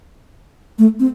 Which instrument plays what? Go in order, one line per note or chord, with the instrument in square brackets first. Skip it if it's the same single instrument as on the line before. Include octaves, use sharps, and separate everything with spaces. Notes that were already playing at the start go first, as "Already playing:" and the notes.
[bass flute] A3
C4